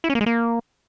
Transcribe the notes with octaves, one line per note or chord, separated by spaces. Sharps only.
E4
C#4
A#3
G#3
A#3